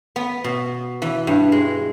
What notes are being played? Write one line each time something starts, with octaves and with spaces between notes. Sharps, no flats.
B3
B2
E3
G2
G#3